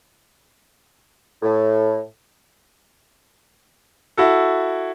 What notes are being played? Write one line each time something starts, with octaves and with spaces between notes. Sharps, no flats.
A2
E4 F#4 A4